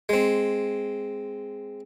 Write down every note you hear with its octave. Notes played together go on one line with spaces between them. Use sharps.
G#3 C4